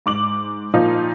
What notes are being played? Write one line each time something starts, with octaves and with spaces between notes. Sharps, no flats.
G#2 D6 F#7
A#2 F3 D#4 F4